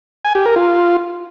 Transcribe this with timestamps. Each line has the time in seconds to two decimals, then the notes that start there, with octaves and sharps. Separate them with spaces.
0.25 G#5
0.35 G4
0.46 A#4
0.56 F4